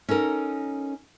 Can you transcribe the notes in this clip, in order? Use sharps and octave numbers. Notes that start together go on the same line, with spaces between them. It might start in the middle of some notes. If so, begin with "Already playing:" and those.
C#4 D#4 A4 A#4